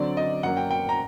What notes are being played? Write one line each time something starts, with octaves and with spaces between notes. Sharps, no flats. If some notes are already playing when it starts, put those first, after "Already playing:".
Already playing: D3 F#3 C4 D5
D#5
F#2 F#3 A#3 F#5
G5
G5
A#5